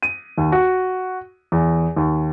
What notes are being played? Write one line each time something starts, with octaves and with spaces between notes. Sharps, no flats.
D#7
D#2
F#4
E2
D#2